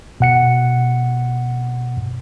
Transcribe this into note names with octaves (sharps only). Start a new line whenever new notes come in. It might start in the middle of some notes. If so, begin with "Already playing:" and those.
B2 F#5 C#7